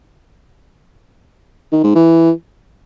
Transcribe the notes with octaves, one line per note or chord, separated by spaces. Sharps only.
D#3
G#2
E3